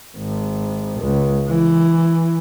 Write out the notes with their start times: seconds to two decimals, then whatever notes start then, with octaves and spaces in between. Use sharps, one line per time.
0.17 G#1
1.00 C#2
1.48 E3